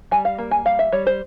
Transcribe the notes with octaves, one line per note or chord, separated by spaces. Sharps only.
G3 G#5
F5
A#3
G#5
G3 F5
E5
G3 C#5
C5